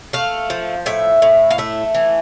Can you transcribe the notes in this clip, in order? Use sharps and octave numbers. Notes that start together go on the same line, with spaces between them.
A3 F5
F3
A2 E5
A2
F5
A3 E5
E3